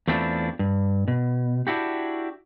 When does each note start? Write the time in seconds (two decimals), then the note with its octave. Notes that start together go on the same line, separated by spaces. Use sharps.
0.08 E2 A3 C4 D4 E4 F4
0.59 G2
1.08 B2
1.67 D4 E4 F#4 G4